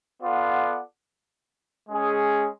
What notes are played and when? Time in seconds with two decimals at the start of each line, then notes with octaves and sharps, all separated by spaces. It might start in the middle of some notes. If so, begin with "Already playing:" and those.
0.22 B3 F4 A4 D5 F#5
1.90 G#3 C#4 G#4